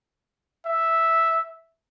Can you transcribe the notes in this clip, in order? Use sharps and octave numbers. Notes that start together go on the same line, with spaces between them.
E5